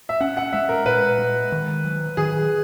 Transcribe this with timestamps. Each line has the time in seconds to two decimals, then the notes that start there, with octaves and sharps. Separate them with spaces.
0.09 E5
0.21 C#4 F#5
0.37 F#5
0.53 G#3 E5
0.69 A#4
0.86 A#2 B4
1.19 G#3
1.52 D#3
1.84 F#3
2.17 D#3 G#4